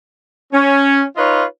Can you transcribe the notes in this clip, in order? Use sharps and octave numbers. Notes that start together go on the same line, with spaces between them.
C#4
D#4 F4 B4 C#5 D#5 F5